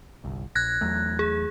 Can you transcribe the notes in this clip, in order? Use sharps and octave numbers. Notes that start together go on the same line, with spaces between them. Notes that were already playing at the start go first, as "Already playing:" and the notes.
G1 C2
A#1 F#6 G#6 A#6
E2 F#3 A3
G#4